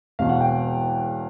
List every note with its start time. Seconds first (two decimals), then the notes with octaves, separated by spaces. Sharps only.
0.19 E1 E2 B2 F5
0.29 F#5
0.41 G5